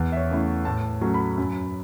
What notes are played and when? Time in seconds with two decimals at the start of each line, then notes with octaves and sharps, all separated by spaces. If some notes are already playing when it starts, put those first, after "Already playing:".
Already playing: E2
0.12 E5
0.17 C#5
0.29 C#3 A3 E4
0.65 A2 A5
1.01 F#3 A3 C#4
1.14 B5
1.38 F#2